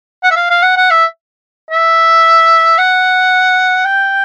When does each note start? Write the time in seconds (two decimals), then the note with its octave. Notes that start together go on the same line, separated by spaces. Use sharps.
0.23 F#5
0.31 E5
0.36 F5
0.50 F5
0.63 F#5
0.77 F#5
0.91 E5
1.71 E5
2.78 F#5
3.85 G5